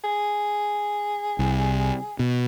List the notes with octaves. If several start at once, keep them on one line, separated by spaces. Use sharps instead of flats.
G#4
C2
B2